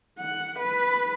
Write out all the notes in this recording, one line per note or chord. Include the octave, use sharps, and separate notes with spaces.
F#5
B4